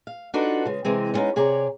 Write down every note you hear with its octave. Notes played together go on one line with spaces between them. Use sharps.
F5
D4 D#4 F4 F#4 A4 B4
C#3 G#3
C3 E3 G#3 C4
G3 G#3 B3 C#4 D#4
C3 G#4 C#5 D5 A#5